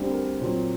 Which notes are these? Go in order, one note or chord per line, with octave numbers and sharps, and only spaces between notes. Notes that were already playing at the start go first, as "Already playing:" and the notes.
Already playing: D2 D3 G3 C4
A#4
A#2 F#3 C4 C5